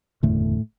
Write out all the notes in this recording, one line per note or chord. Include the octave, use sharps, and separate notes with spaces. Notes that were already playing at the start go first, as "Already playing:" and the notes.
F#1 E2 A2 D3 A3